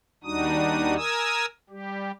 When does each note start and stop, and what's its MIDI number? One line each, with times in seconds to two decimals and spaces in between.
0.24 0.96 39
0.24 0.96 55
0.24 0.96 62
0.24 0.96 63
0.24 0.96 66
0.24 0.96 87
0.96 1.46 70
0.96 1.46 80
0.96 1.46 87
0.96 1.46 88
1.70 2.11 55
1.70 2.11 67